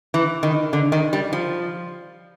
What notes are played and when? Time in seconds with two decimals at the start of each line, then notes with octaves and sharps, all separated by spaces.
0.14 E3
0.43 D#3
0.73 D3
0.92 D#3
1.13 G3
1.33 F3